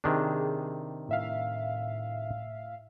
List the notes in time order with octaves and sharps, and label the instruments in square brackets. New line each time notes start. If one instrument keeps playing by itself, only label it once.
[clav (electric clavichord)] C3 D#3 D4 [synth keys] G#4
[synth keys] A2 E5 F5